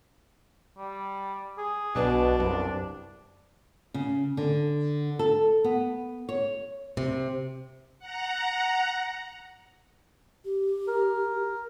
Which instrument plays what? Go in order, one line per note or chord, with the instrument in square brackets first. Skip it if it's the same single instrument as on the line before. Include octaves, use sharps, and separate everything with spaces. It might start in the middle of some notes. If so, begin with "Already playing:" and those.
[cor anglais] G3
G#4
[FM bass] B1 [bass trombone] B2 [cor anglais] D4 [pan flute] B4
[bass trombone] C2 [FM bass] F#2
[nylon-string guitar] C#3
D3
A4
B3
C#5
[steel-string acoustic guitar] C3
[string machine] F#5 A#5
[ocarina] G4
[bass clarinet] A#4